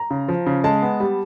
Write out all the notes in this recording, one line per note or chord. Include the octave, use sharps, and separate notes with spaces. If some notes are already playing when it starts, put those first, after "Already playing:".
Already playing: A#5
C#3
F3
C#3
G#3 A5
B3
G3